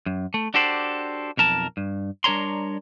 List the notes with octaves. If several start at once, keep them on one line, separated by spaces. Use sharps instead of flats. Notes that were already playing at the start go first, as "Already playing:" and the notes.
F#2
A3
D4 F#4 G4 A4 C5 D5
B1 F2 A#4 A5
G2
G3 D4 A#4 C#5 A#5 C6